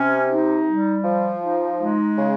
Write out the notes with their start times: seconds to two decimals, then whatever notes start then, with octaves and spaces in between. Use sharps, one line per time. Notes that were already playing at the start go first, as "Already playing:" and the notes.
Already playing: C3 C#4
0.29 D#4
0.66 G3
1.05 F3
1.42 D#4
1.80 G#3
2.18 C#3